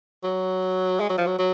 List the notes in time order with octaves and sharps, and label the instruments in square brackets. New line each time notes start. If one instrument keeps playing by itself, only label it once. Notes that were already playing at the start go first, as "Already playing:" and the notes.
[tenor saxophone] F#3
G#3
F#3
F3
F#3
F#3